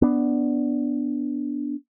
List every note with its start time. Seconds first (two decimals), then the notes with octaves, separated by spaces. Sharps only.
0.02 B3 D4